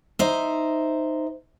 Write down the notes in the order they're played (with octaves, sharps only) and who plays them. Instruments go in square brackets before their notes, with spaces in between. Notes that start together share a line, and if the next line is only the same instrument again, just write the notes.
[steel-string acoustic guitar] D#4 C5 E5